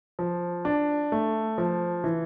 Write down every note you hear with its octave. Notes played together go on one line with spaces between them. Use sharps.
F3
D4
A3
F3
E3